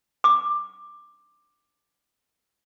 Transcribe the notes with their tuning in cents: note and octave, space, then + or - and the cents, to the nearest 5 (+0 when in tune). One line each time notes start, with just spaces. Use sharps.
D6 +15